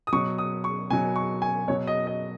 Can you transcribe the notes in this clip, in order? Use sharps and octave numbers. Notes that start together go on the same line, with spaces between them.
D#6
B2 F#3 C#6
D#6
C#6
B2 F#3 G#5
C#6
G#5
B2 F#3 C#5
D#5
D#5